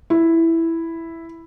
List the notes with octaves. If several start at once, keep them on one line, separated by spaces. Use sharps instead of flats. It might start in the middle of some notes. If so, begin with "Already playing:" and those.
E4